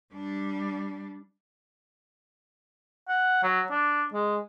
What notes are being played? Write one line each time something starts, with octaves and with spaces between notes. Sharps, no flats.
G3 D4
F#5
F#3
D4
G#3